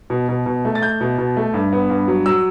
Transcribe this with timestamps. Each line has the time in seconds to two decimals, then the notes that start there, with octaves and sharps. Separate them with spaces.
0.10 B2
0.29 B2
0.46 B2
0.65 A3
0.75 A6
0.82 A3 G6
1.01 B2
1.18 B2
1.37 A3
1.54 G2
1.73 B3
1.90 G2
2.08 F#3
2.26 F#3 E6